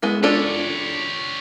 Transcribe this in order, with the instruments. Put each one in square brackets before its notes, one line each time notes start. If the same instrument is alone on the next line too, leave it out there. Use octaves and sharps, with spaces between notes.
[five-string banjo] G#3 B3 E4
[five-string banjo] D4 F4 A4 [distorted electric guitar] G4 C#5